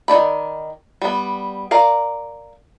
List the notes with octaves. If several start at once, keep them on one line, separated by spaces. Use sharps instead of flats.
D#3 E4 D5 B5
G3 B3
A#4 D5 F5